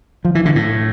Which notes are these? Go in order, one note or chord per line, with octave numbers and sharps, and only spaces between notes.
F3
E3
D3
A2